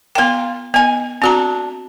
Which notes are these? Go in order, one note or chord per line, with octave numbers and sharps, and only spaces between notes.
A#3 B3 F4 G5
D#3 B3 G#5
A3 C4 D4 F#4 A#5